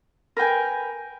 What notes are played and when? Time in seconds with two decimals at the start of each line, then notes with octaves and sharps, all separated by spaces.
0.37 A#4 B4 G5 G#5